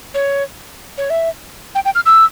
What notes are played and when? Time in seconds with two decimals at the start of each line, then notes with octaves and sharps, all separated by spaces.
0.14 C#5
0.98 C#5
1.10 E5
1.75 G5
1.85 G5
1.95 F6
2.06 E6